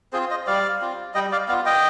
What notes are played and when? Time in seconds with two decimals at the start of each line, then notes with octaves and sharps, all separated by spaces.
0.13 C4 F4 G#4 C5
0.30 C5 D#5
0.47 G3 D5 F5
0.81 C4 F4
1.14 G3 D#5 G5
1.32 D5 F5
1.48 B3 D5 F5
1.51 F4
1.66 D#5 G5